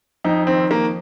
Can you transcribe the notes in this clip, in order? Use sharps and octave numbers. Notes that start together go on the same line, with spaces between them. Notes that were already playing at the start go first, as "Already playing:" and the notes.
F2 D#4
D#3 C4
F2 A#3